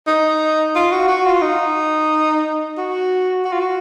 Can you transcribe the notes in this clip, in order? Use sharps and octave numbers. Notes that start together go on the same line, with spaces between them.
D#4
F4
F#4
F#4
F4
D#4
F#4
F#4
F4
F#4